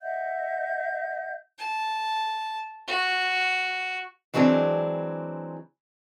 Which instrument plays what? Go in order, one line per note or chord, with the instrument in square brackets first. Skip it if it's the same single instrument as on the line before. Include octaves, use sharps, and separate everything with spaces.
[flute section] D#5 E5 F#5 G6
[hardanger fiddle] A5
F#4
[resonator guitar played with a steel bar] E3 F#3 G#3 C4 D4